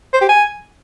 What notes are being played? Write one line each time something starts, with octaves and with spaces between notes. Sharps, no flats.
C5
G4
G#5